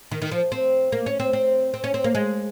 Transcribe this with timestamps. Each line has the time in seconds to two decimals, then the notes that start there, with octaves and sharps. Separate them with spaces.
0.11 D#3
0.22 D#3
0.31 F3
0.52 C4
0.92 A#3
1.06 C#4
1.20 C4
1.33 C4
1.74 C4
1.84 C#4
1.94 C4
2.04 A#3
2.15 G#3